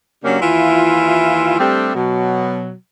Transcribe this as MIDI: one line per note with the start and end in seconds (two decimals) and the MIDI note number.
0.24 0.37 49
0.24 0.37 54
0.24 0.37 58
0.24 0.37 61
0.24 0.37 62
0.24 0.37 67
0.41 1.56 39
0.41 1.56 52
0.41 1.56 64
0.41 1.56 65
1.59 1.94 55
1.59 1.94 57
1.59 1.94 60
1.59 1.94 62
1.59 1.94 67
1.95 2.73 47
1.95 2.73 54